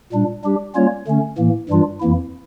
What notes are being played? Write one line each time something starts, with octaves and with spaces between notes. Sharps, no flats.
A#2 G3 D4
G3 D4 G4
G3 A#3 C#4 F4 C#5
D3 A3 C#4
A2 E3 A#3
G2 E3 G3 D4 F4
F2 E3 A#3 E4